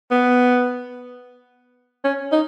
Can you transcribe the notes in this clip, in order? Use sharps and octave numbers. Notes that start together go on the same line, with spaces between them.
B3
C#4
D#4